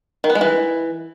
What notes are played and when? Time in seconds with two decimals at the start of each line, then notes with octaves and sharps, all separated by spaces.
0.24 D#3
0.30 B3
0.35 G#3
0.41 E3